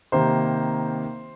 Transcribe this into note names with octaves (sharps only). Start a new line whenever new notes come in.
C3 D#3 A#3 C5